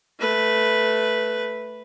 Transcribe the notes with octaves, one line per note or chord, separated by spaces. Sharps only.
A3 B4